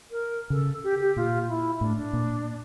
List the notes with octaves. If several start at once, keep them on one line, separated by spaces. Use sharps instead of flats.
A#4
C#3 A4
G4
G4
A#2 F4
E4
A2 D4
D4
A#2